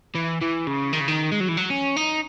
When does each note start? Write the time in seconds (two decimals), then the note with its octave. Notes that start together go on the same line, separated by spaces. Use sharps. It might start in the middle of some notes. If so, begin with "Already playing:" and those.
0.15 E3
0.41 E3
0.67 C#3
0.93 D#3
1.00 C#3
1.08 D#3
1.32 G#3
1.40 F#3
1.49 E3
1.57 F#3
1.70 C#4
1.97 D#4